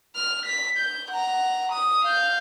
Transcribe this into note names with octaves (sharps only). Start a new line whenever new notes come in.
F6
B6
G6
F#5 A#5
D#6
F5 G6